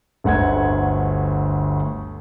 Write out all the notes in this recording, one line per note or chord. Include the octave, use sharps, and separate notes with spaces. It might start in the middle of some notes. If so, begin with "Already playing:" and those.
G1 D2 F#5 G#6